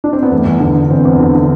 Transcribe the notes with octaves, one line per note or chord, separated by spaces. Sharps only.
D4
C4
B3
E2 A3
E2
D3
D3
E2 C4
E2
D3
D3